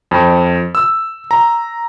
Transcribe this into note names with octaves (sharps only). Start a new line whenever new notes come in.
F2
E6
A#5